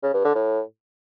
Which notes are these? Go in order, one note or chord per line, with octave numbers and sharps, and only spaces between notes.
C#3
G2
D3
A2